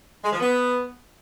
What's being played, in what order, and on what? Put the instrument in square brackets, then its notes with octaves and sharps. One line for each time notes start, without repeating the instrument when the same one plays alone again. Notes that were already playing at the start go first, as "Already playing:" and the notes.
[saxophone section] G#3
F3
B3